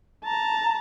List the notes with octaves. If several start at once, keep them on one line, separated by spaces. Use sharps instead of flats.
A5 A#5